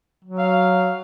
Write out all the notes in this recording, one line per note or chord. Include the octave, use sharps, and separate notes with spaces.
F#3
F5